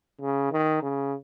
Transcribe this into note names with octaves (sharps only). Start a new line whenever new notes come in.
C#3
D#3
C#3